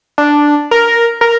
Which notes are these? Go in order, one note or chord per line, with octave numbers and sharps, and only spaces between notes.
D4
A#4
A#4